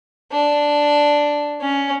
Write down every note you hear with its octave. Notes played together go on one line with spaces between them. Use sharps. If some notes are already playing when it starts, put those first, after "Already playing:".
D4
C#4